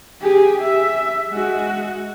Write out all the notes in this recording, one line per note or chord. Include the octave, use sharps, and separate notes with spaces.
G4 G#4
E5
G#3 F#4